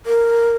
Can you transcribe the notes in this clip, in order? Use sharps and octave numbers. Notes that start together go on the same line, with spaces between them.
A#4